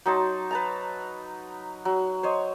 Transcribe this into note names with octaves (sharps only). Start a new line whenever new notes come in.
F#3 D#4 A5 C6
B4 A5 A#5
F#3
C5 C#5 D#5